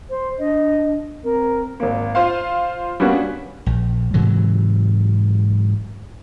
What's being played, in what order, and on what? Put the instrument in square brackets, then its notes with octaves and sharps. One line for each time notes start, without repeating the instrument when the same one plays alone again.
[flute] C5
[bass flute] D4 [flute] D#5
[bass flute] C4 [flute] A#4
[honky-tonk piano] G#1 A#3
F4 C5 F5
G3 A#3 B3 C#4 D4 F#4
[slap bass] A#1
G#2 C3 E3 F#3